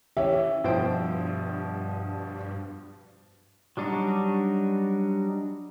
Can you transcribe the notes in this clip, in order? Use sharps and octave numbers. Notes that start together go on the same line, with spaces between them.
E3 C#4 G4 E5
G2 B2 F3 E4 C5 G5
F#3 G3 D4 D#4 F#4